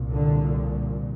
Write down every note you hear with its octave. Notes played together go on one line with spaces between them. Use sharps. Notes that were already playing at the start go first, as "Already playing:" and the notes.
Already playing: C2 A#2
D3